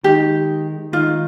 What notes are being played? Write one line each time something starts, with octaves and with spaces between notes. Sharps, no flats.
D#3 G#3 D#4 G4
D#3 G#3 D#4 F4